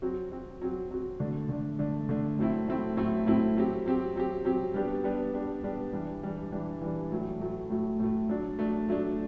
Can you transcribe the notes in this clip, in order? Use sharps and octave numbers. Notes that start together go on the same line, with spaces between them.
F#3 C4 F#4
F#3 C4 F#4
F#3 C4 F#4
F#3 C4 F#4
D3 A3 D4
D3 A3 D4
D3 A3 D4
D3 A3 D4
A2 F#3 A3 C4 E4
A2 F#3 A3 C4 E4
A2 F#3 A3 C4 E4
A2 F#3 A3 C4 E4
F#3 C4 G4
F#3 C4 G4
F#3 C4 G4
F#3 C4 G4
G3 B3 D4 G4
G3 B3 D4 G4
G3 B3 D4 G4
G3 B3 D4 G4
E3 G3 D4
E3 G3 D4
E3 G3 D4
E3 G3 D4
A2 F#3 A3
A2 F#3 A3
A2 F#3 A3
A2 F#3 A3
F#3 A3 D4
F#3 A3 D4
F#3 A3 D4